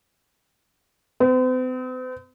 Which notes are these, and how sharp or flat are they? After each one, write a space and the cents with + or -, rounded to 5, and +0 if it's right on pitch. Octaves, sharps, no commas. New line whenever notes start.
C4 -45